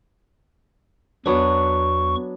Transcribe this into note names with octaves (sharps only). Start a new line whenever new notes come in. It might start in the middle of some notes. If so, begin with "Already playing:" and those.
E2 F#3 B3 D4 C#6